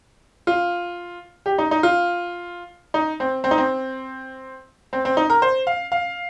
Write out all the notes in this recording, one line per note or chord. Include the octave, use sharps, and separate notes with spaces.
F4
G4
D#4
D#4
F4
D#4
C4
C4
D#4
C4
C4
C4
D#4
A#4
C5
F5
F5